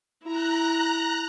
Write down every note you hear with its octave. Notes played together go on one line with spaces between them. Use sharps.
E4 A#5 F#6